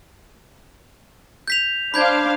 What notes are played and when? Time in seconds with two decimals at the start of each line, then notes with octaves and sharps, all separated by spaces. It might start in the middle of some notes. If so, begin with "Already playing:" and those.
1.48 G6 B6 F7
1.94 D4 C5 F5 B5 G6 G#6